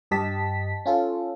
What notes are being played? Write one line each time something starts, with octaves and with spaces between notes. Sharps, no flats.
G2 G4 D#5 A5 B6
C#4 F4 A4